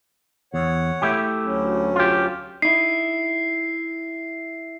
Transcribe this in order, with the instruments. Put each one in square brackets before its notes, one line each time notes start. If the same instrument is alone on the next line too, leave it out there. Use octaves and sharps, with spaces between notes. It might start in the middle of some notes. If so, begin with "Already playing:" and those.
[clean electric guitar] E2 [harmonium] C#5 F#5
[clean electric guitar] A3 E4 G4
[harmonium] D2 F#3 C#4
[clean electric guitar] F4 G4
[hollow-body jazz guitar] D#4 E4 [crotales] C7